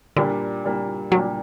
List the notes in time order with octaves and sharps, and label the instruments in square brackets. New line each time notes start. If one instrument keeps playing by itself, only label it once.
[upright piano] A#2 G3 A#3 D4 G4 [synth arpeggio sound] D3
[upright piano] A#2 G3 A#3 D4 G4
[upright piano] A#2 G3 A#3 D4 G4 [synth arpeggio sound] F#3